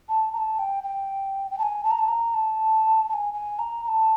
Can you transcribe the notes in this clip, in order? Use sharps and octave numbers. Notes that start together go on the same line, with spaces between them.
A5
A#5
A5
G5
G5
G5
A5
G#5
A5
A#5
A5
A#5
A5
A5
G#5
G#5
A#5
A#5
A5